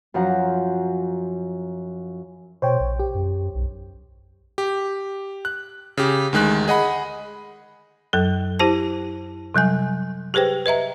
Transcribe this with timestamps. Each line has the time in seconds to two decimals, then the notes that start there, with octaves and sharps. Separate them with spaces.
0.14 F#2 F3 F#5 A#5
2.62 B2 C5 C#5 G5
2.80 A#1
3.00 G4
3.14 F#2
3.55 B1
4.58 G4
5.45 F#6
5.97 C#3 G4
6.33 D2 D#3 G#3 F#6
6.68 G#4 D#5 F#5 B5
8.13 F#2 F#3 A4
8.59 E4 G4 C5 A5
9.54 C3 F#3 G3 G#5
10.34 G4 G#4 B4 C5 G5
10.66 B4 D#5 E5 A#5